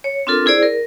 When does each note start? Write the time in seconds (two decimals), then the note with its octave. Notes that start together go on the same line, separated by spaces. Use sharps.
0.04 C#5
0.27 C4 D4 F4 A4 A#4
0.46 E4 G#4 C5 D5
0.63 A#4